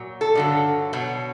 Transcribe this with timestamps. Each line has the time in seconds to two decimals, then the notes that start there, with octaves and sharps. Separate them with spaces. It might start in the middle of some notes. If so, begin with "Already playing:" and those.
Already playing: A#2 F#3
0.21 A4
0.35 G2 D3 F#3
0.93 B2 F#3